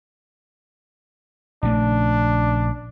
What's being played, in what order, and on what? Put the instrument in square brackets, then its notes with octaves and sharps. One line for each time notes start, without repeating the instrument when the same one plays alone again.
[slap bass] A#1 C#3 A3 [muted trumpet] D4